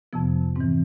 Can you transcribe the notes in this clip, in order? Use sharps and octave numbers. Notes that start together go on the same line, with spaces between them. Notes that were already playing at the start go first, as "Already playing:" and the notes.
F2 C3 F3 B3
G#2 E3 C4